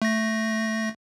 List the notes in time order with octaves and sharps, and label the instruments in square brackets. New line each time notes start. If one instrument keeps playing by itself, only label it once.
[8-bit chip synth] A3 A#6